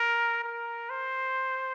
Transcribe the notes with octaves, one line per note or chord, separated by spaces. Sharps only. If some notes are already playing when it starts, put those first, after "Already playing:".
Already playing: A#4
A#4
C5